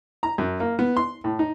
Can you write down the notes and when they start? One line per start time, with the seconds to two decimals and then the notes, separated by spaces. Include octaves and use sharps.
0.23 A#5
0.38 F#2
0.60 A#3
0.79 B3
0.97 C6
1.24 A2
1.39 D#4